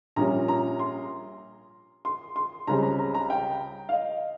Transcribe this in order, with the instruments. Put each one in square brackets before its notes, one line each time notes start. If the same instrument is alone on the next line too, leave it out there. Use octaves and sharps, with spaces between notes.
[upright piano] A#1 A#2 G3 C#4 A#5
A#5
C6
C6
C6
C#2 C#3 G3 C4 A#5
A#5
A#5
A#5
G5
F5
D#5